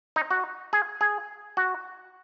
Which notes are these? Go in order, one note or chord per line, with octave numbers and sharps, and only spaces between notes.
D#4
F#4
G#4
G#4
F#4